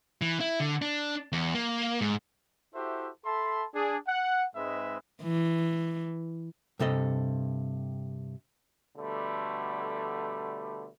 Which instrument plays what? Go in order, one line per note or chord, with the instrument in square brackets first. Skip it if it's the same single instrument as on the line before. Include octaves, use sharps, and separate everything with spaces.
[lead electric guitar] E3
E4
D3
D4
E2
A#3
G#2
[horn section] E4 F#4 G4 A4 C5 E5
A4 E5 A5 B5 C6
D4 G#4
F#5
G#2 G#3 C4 B4 D#5 E5
[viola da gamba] E3
[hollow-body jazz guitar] G2 C3 A4 D#5
[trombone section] B2 D3 G3 A3